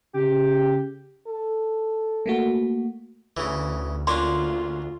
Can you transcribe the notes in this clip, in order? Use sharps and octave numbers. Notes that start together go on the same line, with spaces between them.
C#3 G4
A4
A3 A#3 F#4
D2 C#3 E3
A#3 C#4 D4 F4 C6